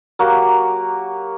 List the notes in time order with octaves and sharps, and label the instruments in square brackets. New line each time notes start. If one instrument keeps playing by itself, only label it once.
[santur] F#3 A#3 F#4 G4